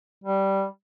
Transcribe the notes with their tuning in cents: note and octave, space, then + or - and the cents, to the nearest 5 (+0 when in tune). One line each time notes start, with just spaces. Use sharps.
G3 -10